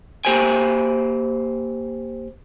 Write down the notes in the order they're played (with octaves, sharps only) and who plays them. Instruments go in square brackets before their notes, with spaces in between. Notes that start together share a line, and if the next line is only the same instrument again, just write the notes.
[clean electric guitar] A#3 G4 C5 G5 G#5